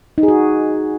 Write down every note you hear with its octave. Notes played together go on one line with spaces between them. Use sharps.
D#4
G#4
F#4